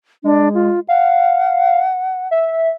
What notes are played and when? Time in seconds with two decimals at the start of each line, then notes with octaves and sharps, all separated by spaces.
0.24 G#3 D4
0.54 F4
0.88 F5 F#5
2.31 E5